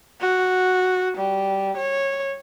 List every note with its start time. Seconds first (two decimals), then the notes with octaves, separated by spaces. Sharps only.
0.21 F#4
1.18 G3
1.77 C#5